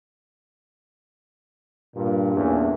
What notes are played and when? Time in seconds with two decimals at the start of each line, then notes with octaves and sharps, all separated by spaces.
1.95 G2 A#2
2.35 E2 A2 A#3 C#4 D4